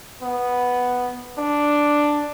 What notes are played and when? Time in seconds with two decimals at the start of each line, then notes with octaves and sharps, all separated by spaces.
0.22 B3
1.38 D4